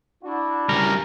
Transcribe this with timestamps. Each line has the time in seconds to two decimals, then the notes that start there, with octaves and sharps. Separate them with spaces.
0.23 D4 E4 F#4
0.69 C#3 G3 A#4